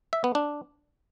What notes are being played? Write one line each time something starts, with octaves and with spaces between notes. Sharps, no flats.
E5
B3
D4